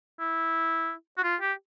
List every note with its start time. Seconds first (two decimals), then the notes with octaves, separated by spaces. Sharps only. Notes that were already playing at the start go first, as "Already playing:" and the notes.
0.20 E4
1.18 F#4
1.24 F4
1.41 G4